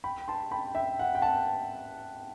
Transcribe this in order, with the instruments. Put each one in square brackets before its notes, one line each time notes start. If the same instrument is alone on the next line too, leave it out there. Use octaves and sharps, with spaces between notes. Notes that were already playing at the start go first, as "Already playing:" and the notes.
[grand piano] G5 B5
A5 C6
G5 B5
E5 G5
F#5
G5
F#5 A5